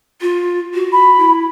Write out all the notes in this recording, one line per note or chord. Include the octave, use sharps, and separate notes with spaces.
F4
F#4
B5
E4